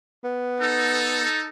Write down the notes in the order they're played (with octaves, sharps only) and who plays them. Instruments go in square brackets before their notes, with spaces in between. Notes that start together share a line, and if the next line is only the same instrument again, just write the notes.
[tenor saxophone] B3
[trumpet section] D#4 A4